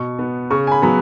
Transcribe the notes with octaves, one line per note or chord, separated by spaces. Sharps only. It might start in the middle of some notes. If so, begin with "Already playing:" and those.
Already playing: B2 C#6
B3
C#3 C#6
G#5
B5
F#3 B3 B5